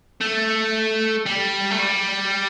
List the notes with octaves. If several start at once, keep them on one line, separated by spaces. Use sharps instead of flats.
A3
G3
A3
G3